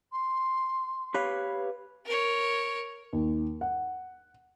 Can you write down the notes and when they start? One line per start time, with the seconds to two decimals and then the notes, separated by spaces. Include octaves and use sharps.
0.12 C6
1.14 G4 B4 C#5 F5
2.06 A#4 C#5
3.13 D#2
3.61 F#5